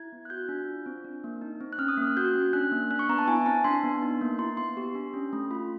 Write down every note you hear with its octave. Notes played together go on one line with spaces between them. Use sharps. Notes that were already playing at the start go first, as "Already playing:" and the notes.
Already playing: E4 G#6
B3
F#6
F#4 G6
D4
F4
C4
D4
A#3
D#4
C4
F#6
C#4 F6
D#6
A#3
F#6
F#4 G6
C#4
D4 F#6
A#3
D4 F#6
C#6
B3 A#5
A5
E4 G#5
C4 A5
D4 C6
B3
D#4
A#3
E4 C6
B3 C6
G4
D4
C#4
A3
F4 B5